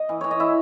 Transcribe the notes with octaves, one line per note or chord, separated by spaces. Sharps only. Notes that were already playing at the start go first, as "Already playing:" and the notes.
Already playing: D#5
E3
E3 C#5
D#5
E4 E5